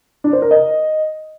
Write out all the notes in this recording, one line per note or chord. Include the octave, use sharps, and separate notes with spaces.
D4
C5
A#4
D#5